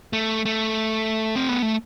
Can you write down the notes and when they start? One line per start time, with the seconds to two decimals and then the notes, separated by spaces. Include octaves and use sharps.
0.13 A3
0.45 A3
1.36 C4
1.49 B3
1.62 A3